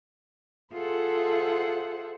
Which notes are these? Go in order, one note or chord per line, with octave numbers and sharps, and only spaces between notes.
F4 G#4 A4 C5 E5 F#5